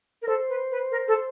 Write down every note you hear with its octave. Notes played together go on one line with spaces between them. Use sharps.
A#4
A4 C5
B4
B4
A#4
A4